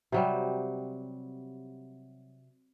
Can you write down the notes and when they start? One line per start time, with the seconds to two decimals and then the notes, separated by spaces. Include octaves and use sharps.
0.12 C3 F#3 G3